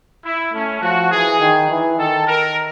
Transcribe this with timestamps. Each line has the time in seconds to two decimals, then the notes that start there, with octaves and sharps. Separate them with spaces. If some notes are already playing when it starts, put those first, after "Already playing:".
0.25 E4
0.53 A3 C#4
0.82 F3 F#4
1.11 E3 G#4
1.41 D#3
1.70 E3
1.98 D#3 A4
2.27 A#4